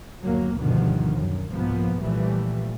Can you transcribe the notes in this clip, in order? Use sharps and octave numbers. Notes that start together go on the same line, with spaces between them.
G1 D#2 F#3 A#3
D2 G2 B2 D3 D#3 F3
F#2
C2 G#2 B2 F3 A#3 B3
A#2 E3 F3 G3 A3